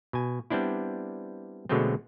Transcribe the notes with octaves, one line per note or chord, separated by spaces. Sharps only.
B2 G#5
G3 B3 C4 D4 E4
B2 D3 F#3 G#3 A3 C4